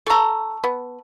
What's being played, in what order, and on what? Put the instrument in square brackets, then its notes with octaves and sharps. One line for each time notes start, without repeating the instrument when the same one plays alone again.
[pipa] A4 A#5 [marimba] A5 C#6 E6
[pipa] B3